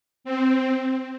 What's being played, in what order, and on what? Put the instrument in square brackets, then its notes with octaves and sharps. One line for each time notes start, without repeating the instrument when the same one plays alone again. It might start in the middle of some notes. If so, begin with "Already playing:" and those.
[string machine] C4